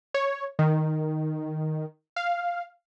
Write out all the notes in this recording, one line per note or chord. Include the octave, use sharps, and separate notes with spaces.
C#5
D#3
F5